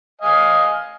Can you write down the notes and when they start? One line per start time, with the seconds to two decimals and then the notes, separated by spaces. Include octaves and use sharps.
0.21 D#5 F5 G#5